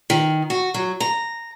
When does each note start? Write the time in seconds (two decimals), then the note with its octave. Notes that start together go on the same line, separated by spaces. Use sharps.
0.10 D#3
0.50 F#4
0.74 F#3
1.00 A#5